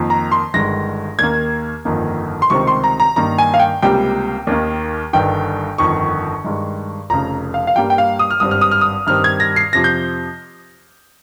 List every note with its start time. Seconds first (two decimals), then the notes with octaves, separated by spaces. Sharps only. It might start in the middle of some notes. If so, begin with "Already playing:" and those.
Already playing: F2 D#3 A#3
0.10 A#5
0.32 C6
0.54 G1 G2 D#3 G#3 A#6
1.19 D#2 D#3 A#3 G#6
1.85 G1 F2 D#3 A#3
2.42 C6
2.50 C#2 C3 D#3 G3 C4 C#6
2.67 C6
2.84 A#5
3.00 A#5
3.16 G2 D#3 A#3 A#5
3.38 G#5
3.54 F5
3.59 G5
3.82 C#2 C3 G3 A#3 G5
4.47 D#2 D#3 A#3
5.13 G1 G2 D#3 G5
5.78 G1 F2 D#3 C#6
6.44 G2 D#3 G#3
7.10 F1 F2 C#3 A#5
7.54 F5
7.67 F5
7.76 G2 G3 A#3 G5
7.90 G5
7.98 F5
8.19 D#6
8.31 F6
8.40 G#1 G2 G3 C4 D#6
8.51 F6
8.61 D#6
8.71 F6
8.81 D#6
9.07 G2 D#3 G3 C4 F6
9.24 G#6
9.40 A#6
9.56 C7
9.73 F2 C3 F3 A#6
9.84 G6